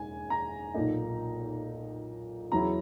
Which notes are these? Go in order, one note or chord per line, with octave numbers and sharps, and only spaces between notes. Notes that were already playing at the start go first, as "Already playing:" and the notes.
Already playing: E1 D#2 C#3 G#5
A#5
B1 A#2 A#3 D#4
E2 C#3 F#3 C#4 E4 A#5